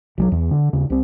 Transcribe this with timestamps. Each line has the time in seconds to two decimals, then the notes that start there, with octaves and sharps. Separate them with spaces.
0.18 B1 F3 F#3
0.32 E2
0.51 D3
0.73 D#2 C#3
0.90 C2 C4